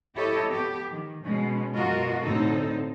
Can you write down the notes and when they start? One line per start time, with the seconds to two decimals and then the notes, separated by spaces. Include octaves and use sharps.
0.15 E4 G4 A4 C#5 D#5
0.47 B3 G4
0.89 D#3
1.23 B2 G#3 C#4
1.75 F#2 B2 F4 F#4 A#4 D#5
2.22 D2 A2 D3 C4 D#4 A4